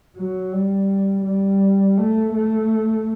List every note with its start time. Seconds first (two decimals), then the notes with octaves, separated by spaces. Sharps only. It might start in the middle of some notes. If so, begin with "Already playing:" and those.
0.16 F#3
0.53 G3
1.25 G3
1.98 A3
2.34 A3